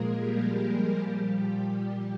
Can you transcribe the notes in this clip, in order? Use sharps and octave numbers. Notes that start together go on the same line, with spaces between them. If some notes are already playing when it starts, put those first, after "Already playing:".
Already playing: A#2 F3 G#3 A#3 G#4 A#4
G3 G4
A#2 F3